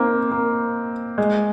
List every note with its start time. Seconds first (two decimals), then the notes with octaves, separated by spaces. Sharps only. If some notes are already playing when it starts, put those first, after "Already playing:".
Already playing: A#3 C4 D#4
0.32 A#3
1.18 G#3